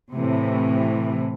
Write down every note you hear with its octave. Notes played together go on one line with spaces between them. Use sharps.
A2 C3 E3